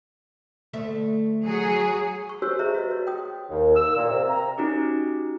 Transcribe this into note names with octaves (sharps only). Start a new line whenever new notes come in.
D2 A3 E5
F#3 G#4
C#6
F#4 G4 A4 C5 C#5 E6
G#4 C5 C#5 D#5 E5 A#5
F#4 B4 D#5
F#4 C#5
G5 D#6
D#2
E6
A#2
C3
A#5
C#4 D#4 F#4 G4